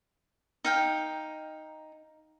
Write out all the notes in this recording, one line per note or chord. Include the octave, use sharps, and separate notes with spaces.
D#4 F5 G5